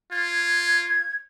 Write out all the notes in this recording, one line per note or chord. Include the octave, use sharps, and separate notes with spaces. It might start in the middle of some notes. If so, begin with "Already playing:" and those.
F4 G#6